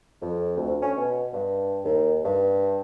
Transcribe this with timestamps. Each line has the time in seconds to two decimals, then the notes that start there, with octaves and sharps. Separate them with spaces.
0.22 F2
0.57 D2
0.82 C#4
0.97 B2
1.33 G2
1.85 D#2
2.24 G2